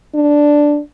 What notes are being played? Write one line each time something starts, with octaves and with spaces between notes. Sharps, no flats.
D4